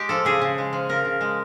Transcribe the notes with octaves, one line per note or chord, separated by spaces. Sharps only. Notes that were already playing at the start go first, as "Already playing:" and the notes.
Already playing: G#3 G4
F3 A4
C#3 G#4
C#3
G#3
F3
C#3 A#4
C#3
G#3